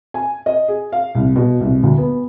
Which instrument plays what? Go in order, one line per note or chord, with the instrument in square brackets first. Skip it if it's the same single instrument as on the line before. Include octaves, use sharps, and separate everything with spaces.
[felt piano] G#5
D#5
G#4
F5
C2
B2
C2
D2
B3